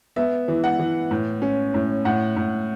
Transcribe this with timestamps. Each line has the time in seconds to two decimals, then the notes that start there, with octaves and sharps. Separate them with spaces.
0.16 B3 E5
0.48 E3
0.64 F#5
0.79 E3
1.11 A2
1.42 C#4
1.74 A2
2.05 A2 F#5
2.36 A2